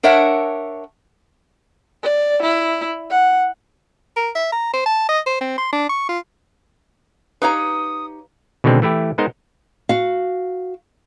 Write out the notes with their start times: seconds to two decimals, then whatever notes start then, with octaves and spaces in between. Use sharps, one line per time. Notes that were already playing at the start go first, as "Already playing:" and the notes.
0.03 D4 A#4 C#5 E5 F#5
2.03 D5
2.42 E4
3.10 F#5
4.16 A#4
4.35 E5
4.52 A#5
4.73 C5
4.86 A5
5.09 D#5
5.26 C5
5.41 C4
5.58 C6
5.72 D4
5.90 C#6
6.09 F4
7.42 D#4 G4 B4 C#5 F5 A#5 D#6
8.64 B2 D3 D#3 G#3 C4
8.82 E3 A3 E4 G4
9.18 G#3 B3 D#4 A#4 C5 D#5
9.89 F#4 F5